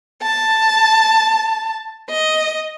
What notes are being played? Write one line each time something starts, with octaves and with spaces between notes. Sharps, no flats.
A5
D#5